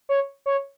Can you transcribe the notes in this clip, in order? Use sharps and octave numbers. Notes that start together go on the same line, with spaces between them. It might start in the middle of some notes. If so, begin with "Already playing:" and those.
C#5
C#5